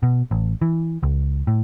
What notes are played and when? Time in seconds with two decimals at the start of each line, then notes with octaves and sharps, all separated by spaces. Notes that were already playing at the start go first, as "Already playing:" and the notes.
0.03 B2
0.31 A1
0.62 E3
1.03 C#2
1.47 A2